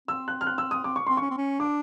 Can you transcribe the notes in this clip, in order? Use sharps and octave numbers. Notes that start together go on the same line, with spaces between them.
C4 E6
F#6
F6
F#6
E6
D#6
C4 D6
C#6
C4 C6
C#4 C#6
C4
C#4
D4 D6